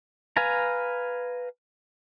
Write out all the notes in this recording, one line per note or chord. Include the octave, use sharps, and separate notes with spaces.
B4 F5 G#5 A#5